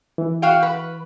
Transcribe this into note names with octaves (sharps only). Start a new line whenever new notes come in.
E3
F#4 F5 G5
B4